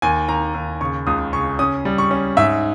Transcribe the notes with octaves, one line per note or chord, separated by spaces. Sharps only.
D#2 G#5
D#2 A#5
D#2
C#3 C#6
C#2 D#6
C#3 C#6
C#4 D#6
G3
C#6
C#4
G#2 E5